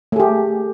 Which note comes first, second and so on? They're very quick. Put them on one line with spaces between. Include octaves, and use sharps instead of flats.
A3 G#4 G4